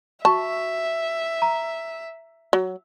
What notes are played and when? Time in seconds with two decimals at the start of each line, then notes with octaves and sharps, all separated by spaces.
0.25 F#4 E5 A5 C#6
1.42 A#5
2.53 F#3